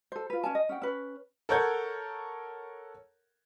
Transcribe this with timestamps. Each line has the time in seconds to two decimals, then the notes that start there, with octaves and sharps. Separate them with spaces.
0.12 A4 C5
0.30 F4 B4
0.44 C#4 C#5 G#5 A5
0.55 D#5
0.69 C#4 F#5 G5
0.82 C#4 B4
1.49 A4 A#4 C#5 F#5 G6 G#6